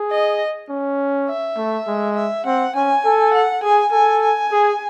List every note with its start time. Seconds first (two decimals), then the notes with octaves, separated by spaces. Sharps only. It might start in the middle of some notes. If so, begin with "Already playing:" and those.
Already playing: G#4
0.11 D#5
0.69 C#4
1.28 E5
1.57 A3
1.87 G#3
2.16 E5
2.46 C4 F#5
2.75 C#4 G#5
3.05 A4
3.34 F#5
3.63 G#4 G#5
3.92 A4 G#5
4.22 G#5
4.52 G#4